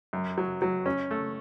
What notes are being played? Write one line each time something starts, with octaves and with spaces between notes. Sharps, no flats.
F#2
F#3
F#3
C#4
A3